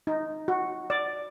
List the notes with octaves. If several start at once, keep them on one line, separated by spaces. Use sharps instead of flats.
D#4
F#4
D5